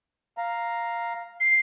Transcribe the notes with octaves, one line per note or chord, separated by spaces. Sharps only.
F5 A#5
C7